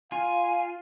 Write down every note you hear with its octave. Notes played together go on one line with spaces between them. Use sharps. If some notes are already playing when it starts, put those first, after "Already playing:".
F4 F5 G#5